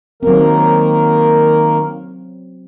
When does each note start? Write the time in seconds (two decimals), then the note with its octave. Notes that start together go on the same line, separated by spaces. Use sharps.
0.23 D#3 F#3 A#3 C4 A#4